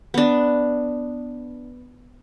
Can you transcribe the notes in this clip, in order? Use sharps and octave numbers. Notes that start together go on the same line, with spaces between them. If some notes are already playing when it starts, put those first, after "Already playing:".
B3 D4